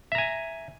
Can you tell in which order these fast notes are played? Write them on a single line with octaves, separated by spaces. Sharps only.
E5 A#5 G#5